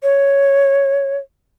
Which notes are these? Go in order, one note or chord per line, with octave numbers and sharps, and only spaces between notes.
C#5